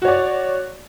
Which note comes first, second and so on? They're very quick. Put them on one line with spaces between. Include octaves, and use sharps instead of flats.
F#4 C#5 D5